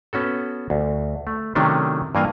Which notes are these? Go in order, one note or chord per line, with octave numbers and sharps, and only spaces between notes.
B3 C#4 F#4 A4
D2
A3
C3 D#3 F#3 A3 C#4 D4
G2 E3 A#3 F4 G#5 A#5